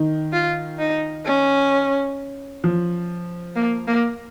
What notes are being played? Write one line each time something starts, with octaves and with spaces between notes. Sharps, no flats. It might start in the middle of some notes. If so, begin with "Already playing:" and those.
Already playing: D#3
F4
D#4
C#4
F3
A#3
A#3